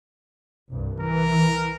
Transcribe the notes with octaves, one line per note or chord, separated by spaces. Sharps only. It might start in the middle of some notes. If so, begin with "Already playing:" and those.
C2 G2
E3 A#4